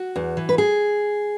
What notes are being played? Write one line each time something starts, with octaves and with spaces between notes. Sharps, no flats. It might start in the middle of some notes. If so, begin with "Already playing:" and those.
Already playing: F#4
E2
E3
B4
G#4